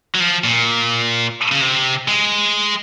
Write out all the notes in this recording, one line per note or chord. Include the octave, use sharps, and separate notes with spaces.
F#3
F3
A#2
C#3
C3
G#3